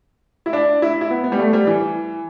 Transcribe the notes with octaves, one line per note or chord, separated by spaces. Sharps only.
E4
D4
E4
E4
B3
B3
G3
A3
G3
E3